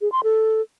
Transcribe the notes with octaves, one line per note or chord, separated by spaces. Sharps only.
G#4
C6
A4